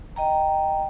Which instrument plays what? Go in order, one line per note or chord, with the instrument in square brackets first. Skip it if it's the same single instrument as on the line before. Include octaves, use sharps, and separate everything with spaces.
[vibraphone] D#5 G5 A#5